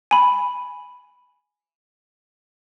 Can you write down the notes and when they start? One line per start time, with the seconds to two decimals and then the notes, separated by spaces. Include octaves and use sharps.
0.11 G#5 B5